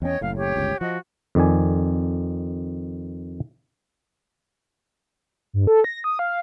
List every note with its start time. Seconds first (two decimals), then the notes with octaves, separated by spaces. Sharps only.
0.02 E2 C#4 C#5 D#5 G5
0.21 F#1 A2 F5
0.36 G4 C#5
0.56 G1 C#2
0.81 F3 F#4 D#5
1.35 F2 D#3 D5 G#5
5.53 G2
5.67 A4
5.84 A#6
6.04 D#6
6.19 F5